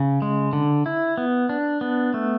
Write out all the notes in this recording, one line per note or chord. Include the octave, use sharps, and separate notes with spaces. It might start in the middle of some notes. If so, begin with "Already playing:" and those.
Already playing: C#3
G#3
D3
E4
B3
D4
B3
A3